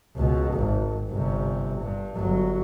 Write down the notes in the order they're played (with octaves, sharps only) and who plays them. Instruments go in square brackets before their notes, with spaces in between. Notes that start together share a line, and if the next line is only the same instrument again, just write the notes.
[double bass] C#2 B2
G#1
G1 C3
G2
G1 F#3